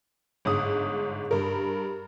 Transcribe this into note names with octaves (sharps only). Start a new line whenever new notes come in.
G1 G#2 D#6
G2 A#4